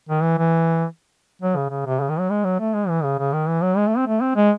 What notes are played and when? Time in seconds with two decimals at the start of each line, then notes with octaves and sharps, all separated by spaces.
0.09 D#3
0.22 E3
0.38 E3
1.42 F#3
1.56 C#3
1.70 C#3
1.86 C3
2.00 C#3
2.09 D#3
2.19 F#3
2.30 G#3
2.44 F#3
2.59 A3
2.74 G#3
2.89 E3
3.03 C#3
3.18 C#3
3.33 D#3
3.48 E3
3.62 F#3
3.77 G#3
3.88 A3
3.97 C4
4.07 A3
4.21 C4
4.36 G#3